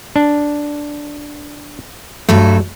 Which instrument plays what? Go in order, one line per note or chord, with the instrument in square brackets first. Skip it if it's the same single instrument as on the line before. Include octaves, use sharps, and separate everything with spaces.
[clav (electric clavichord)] D4
[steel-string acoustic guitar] G2 F#3 A4 [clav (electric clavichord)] A3